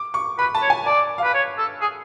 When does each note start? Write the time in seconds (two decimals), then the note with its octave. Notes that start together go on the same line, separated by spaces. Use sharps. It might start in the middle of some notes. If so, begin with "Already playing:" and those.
Already playing: D6
0.14 C#6
0.39 B4 B5
0.55 A5
0.62 C#5
0.70 G#5
0.86 D5 A5
1.18 F5
1.23 B4
1.34 C#5
1.58 A4
1.81 G#4